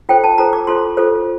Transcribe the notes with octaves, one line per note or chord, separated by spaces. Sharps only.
F4 A4 C5 G5
A5
F4 A4 C5 A#5
D6
F4 A4 C5 C6
F4 A4 C5